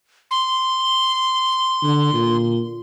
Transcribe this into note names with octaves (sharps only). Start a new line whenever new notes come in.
C6
D3
A#2